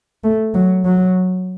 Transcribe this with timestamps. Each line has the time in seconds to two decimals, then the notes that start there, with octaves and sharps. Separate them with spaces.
0.24 A3
0.55 F#3
0.85 F#3